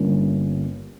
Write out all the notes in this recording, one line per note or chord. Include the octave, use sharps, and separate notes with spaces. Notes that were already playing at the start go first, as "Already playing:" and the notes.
Already playing: G1 G2 G3 A#3 C#4